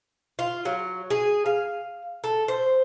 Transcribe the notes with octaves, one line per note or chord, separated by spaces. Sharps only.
F4
F#3
G#4
F5
A4
C5